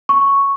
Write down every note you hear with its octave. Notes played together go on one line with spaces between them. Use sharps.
C#6